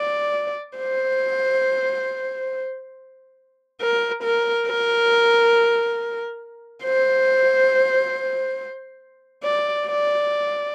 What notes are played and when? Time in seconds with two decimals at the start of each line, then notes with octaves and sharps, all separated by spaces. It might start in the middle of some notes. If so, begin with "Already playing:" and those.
Already playing: D5
0.78 C5
3.81 A#4
4.23 A#4
4.67 A#4
6.84 C5
9.43 D5
9.87 D5